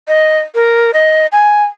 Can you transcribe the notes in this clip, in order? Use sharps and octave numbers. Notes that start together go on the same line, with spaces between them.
D#5
A#4
D#5
G#5